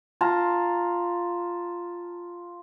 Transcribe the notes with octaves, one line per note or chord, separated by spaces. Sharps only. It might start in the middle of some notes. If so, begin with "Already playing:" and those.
F4 A5 A#5